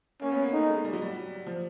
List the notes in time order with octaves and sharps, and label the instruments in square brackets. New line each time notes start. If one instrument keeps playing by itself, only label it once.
[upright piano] A#3 [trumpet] C#4
[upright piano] B3
A#3
[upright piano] A3 [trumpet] D#4
[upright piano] G#3
G3
F#3
G3
F3